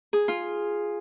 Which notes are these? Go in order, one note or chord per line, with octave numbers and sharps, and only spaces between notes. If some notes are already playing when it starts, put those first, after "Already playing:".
G#4
F4